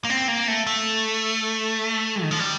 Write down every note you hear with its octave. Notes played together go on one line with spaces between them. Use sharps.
A#3
C4
A#3
A3
A3
D#3
F3
G3